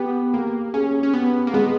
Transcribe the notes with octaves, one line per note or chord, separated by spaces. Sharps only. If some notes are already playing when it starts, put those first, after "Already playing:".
Already playing: B3 G4
A#3 G4
C#4 G#4
C#4
B3 G4
A#3
G#3 B3